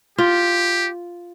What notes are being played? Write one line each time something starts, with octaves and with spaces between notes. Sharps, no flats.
F4 G4